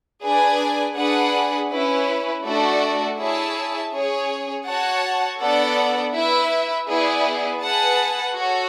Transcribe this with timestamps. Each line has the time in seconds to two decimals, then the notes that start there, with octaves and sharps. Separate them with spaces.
0.23 D4 G#4 B4 D5 G#5
0.97 D4 G#4 B4 F#5
1.71 C#4 E4 B4
2.44 A3 D4 F#4 A4 D5
3.18 E4 G#4 C#5 E5 A5
3.92 C#4 G#4 C#5
4.67 F#4 C#5 F#5 A5
5.41 B3 D4 A4 D5 F#5
6.14 E4 B4 E5
6.89 B3 E4 G#4 D5
7.62 G#4 B4 F#5 A5
8.37 F#4 A4 C#5